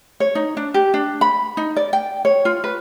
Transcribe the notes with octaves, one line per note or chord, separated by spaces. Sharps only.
C#5
D#4
D4
G4
D4
B5
D#4
D5
G5
C#5
F4
B4